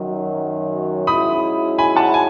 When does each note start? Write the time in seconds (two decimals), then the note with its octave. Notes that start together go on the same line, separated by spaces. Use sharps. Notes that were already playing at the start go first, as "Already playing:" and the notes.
Already playing: F#2 D#3 F#3
1.07 G#2 F#3 C#4 E4 B5 D#6
1.78 G#5 B5
1.96 F#5 A5
2.14 G#5